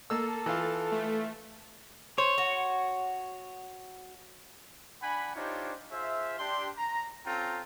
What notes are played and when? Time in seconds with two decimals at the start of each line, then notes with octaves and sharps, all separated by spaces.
0.10 A#3 A4 E6
0.46 E3 F4
0.92 A3
2.18 C5 C#5
2.38 F#4
5.03 D4 F#5 G#5 B5
5.36 D4 D#4 F4 G4 C5 C#5
5.92 F4 G#4 C5 E5
6.39 D4 G4 C6
6.78 A#5
7.26 C4 C#4 F4 A4 G5 A#5